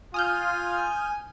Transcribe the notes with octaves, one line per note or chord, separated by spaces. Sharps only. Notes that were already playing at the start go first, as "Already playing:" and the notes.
F4 G#5 D#6 F6 G6